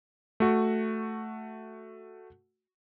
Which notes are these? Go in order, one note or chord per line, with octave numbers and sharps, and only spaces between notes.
A3 F#4